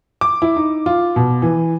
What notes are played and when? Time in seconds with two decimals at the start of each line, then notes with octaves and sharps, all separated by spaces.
0.21 D6
0.42 E4
0.57 D#4
0.86 F4
1.16 B2
1.42 E3